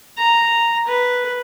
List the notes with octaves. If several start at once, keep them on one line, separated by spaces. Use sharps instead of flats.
A#5
B4